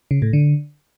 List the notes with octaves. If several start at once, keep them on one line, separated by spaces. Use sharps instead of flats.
C#3
A2
D3